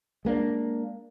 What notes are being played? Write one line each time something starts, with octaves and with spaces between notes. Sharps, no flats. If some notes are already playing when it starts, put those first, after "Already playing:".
G#3 A#3 C4 D4